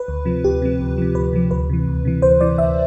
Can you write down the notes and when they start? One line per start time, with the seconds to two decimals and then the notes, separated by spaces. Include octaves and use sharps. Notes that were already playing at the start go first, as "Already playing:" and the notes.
Already playing: B4
0.08 D2
0.25 C3 F3
0.44 D2 G4
0.62 C3 F3
0.80 D2
0.98 C3 F3
1.15 D2 B4
1.33 C3 F3
1.51 D2 B4
1.69 C3 E3
1.88 D2
2.05 C3 E3
2.22 D2 C5
2.40 C3 E3 D5
2.58 D2 E5